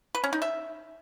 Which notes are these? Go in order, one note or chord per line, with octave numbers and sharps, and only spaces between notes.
B4
C#4
D#4
E5